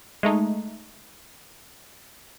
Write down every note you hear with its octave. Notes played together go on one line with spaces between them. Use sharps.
G#3 A3 D#4